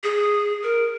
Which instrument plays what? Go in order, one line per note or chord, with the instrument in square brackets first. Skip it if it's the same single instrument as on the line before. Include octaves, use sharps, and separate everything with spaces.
[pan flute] G#4
A#4